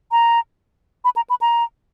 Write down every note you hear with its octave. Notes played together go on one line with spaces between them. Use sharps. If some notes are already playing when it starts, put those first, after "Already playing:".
A#5
B5
A#5
B5
A#5